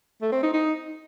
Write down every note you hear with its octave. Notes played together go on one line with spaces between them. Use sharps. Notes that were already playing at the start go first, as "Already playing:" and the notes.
A3
C4
D#4
D#4